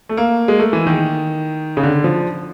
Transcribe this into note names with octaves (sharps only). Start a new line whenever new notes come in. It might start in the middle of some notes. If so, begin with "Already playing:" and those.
A3
A#3
G#3
A3
E3
D#3
C#3
D3
F3